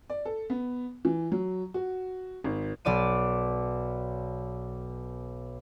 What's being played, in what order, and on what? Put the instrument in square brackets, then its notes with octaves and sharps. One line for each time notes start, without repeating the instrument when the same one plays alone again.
[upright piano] D5
A4
B3
E3
F#3
F#4
G#1
[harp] B1 D5 D6 D#7